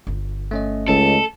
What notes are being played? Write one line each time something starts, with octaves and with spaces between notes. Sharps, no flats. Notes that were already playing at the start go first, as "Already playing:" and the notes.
G1 F4
A3 C#4 D#5
C#2 A4